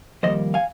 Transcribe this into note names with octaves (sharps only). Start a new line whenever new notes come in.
F2 D#3 G3 A#3 C5 D#5
F5 G#5